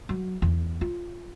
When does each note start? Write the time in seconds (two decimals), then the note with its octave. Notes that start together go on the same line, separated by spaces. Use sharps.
0.09 F#3
0.42 E2
0.81 F4